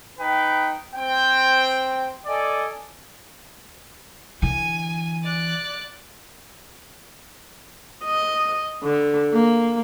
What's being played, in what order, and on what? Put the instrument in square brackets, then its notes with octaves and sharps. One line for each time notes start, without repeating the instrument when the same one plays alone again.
[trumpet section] D#4 B4 G5
C4 G5
A4 D5 D#5 G#5
[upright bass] D3 E3 [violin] G#5
[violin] D5 F#6
[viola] D#5
D3
A#3